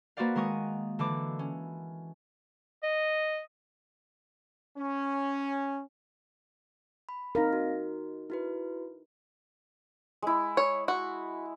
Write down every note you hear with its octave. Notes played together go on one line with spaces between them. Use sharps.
A#3 F#4 B4 C5 D5 F5
D#3 G#3 A#4 C#6 D#6
D3 E3 D6
C#4
D#5
C#4
B5
C4 D#4 A#4 F5 A#6
F#4
E4 F#4 B4
G#3 E4
C#5
F#4